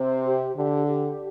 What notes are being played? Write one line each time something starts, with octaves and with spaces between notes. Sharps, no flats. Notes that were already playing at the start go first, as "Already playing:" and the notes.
Already playing: C3 C5
G4
D3 G4
G4